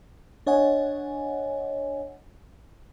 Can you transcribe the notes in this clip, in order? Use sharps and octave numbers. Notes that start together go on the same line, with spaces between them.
D4 C#5 D#5 F#5 G#5